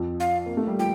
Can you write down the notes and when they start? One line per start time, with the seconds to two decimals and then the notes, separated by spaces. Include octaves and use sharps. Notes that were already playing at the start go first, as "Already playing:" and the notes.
Already playing: F2 F3
0.20 F5
0.46 A#3
0.57 A3
0.67 G3
0.79 F3 G5